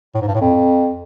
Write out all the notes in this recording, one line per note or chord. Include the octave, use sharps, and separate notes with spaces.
A2
G#2
G2
A2
F2